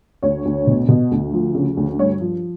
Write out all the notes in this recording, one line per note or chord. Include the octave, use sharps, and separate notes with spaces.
D2 C#5
D2
B2
B2
D2
F3
C#3
D2
G2 C#5
F3